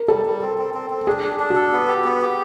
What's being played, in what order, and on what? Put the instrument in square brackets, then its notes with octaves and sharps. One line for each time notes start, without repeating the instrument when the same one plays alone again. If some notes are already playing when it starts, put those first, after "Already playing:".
Already playing: [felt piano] A#4
[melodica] G3 [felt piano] A4
[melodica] G3
C4
C4
C4
C4
[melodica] D4 [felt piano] G#4
[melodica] D4
D4
[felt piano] F#4
[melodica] A4
B3
G4
B3
G4